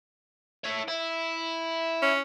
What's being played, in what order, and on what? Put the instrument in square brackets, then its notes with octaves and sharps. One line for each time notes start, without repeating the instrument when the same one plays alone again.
[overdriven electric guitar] E4 C#5
E4
[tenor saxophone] C#4